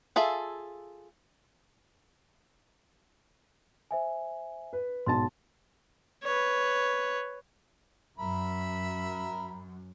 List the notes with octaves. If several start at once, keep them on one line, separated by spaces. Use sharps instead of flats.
F4 G#4 A4 E5
C5 E5 G#5
B4
B1 G#2 A5 C6 A6
B4 C#5
F#2 A#4 E5 B5